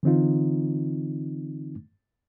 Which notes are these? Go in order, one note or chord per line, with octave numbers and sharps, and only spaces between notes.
D3 E3 C4 D#4 F4